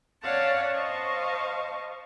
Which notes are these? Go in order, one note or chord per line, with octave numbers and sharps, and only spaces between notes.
C#4 C#5 D5 F5 F#5 A5
C5 D#5 F5 A5 C#6